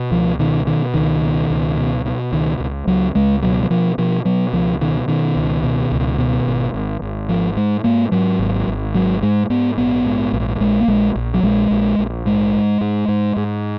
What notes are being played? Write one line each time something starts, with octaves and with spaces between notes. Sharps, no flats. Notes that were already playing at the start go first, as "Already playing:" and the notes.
Already playing: B2
C#2 F3
B2 D#3
B2 D#3
C#2 D#3
B2
C#2
B2
B2
C#2 D#3
C#2
C#2 F#3
C#2 G#3
B2 F#3
F#3
B2 F3
B2 F3
B2 F#3
C#2 F3
B2 D#3
B2 D#3
C#2
B2
C#2
B2
G#1
G#1
G#1
G#2 F3
G#2 G#3
G#2 A#3
G#2 F#3
G#1
G#1
G#2 F#3
G#2 G#3
G#2 B3
A#1 B3
G#2
A#1
A#1 G#3
A#3
A#1 G#3
A#1
F#3
A#1 G#3
A#1
A#1
G#2 G#3
G#2
G#2
G#2
G#2